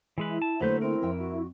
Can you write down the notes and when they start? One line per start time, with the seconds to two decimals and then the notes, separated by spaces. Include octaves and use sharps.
0.18 E3 G#3 E4 B4
0.42 A5
0.61 D3 F#3 A3 A#3 B4 C5 G6
0.82 C4 A#4
1.02 F2 E5 G5
1.19 F#4